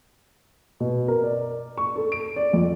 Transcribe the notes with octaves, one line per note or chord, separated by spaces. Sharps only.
B2
A#4
D5
C#6
A4
D7
D5
F2